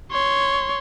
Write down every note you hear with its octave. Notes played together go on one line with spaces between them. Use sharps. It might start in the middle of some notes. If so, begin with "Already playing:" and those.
C#5 C6